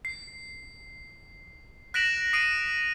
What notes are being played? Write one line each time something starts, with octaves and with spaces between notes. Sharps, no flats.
C7
F#6 A#6 B6 D7 E7 F#7
D#6 C7 D7 D#7